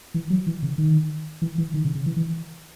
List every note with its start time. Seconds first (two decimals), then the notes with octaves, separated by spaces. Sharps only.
0.14 E3
0.30 F#3
0.47 E3
0.63 C#3
0.78 D#3
1.42 E3
1.58 E3
1.74 D#3
1.85 C#3
1.95 C#3
2.06 E3
2.16 E3